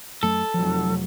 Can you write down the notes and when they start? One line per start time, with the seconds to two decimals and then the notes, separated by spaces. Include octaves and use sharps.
0.23 F#2 F#3 A3 A4
0.54 F1 F3 F#3